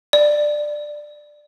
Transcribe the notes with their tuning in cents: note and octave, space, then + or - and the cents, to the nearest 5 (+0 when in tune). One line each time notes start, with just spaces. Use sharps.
D5 +10